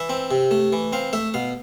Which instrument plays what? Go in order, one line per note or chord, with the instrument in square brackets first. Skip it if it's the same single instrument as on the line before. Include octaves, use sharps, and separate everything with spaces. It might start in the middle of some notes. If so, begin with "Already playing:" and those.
Already playing: [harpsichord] E3 E5
C4
C3
A3
E3
C4 F5
A3 E5
B2 F5